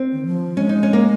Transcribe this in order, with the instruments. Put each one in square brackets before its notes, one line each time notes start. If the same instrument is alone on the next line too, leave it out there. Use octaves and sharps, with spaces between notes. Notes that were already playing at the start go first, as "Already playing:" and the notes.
Already playing: [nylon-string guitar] C4
[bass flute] D#3
F3
[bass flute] G#3 [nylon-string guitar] C#4
[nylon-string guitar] D#4
C#4
A#3